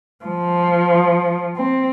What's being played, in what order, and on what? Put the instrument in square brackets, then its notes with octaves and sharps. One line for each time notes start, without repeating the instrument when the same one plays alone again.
[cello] F3
C4